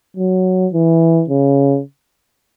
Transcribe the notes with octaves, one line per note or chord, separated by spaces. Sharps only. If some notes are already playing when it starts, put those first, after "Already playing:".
F#3
E3
C#3